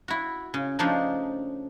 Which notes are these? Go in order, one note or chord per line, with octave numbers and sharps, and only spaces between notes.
E4 F#4
C#3
C#3 F3 A3 D4 D#4 C5